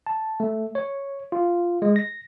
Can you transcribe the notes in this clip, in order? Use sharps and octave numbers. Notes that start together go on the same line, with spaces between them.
A5
A3
C#5
F4
G#3
A#6